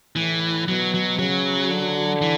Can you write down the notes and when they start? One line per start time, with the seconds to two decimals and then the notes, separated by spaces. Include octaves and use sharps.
0.16 A2 E3
0.69 B2 F#3
0.94 F#3
1.19 C#3 F#3
1.71 D3
2.22 E3